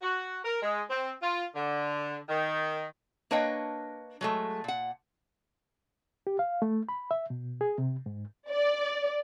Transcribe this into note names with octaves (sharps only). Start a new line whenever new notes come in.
F#4
A#4
G#3
C4
F4
D3
D#3
A#3 D4 B4 C#5 D#5 G5
F#3 G#3 A3
A#2 F#5
G4
F5
A3
B5
E5
B2
G#4
C3
G#2
D5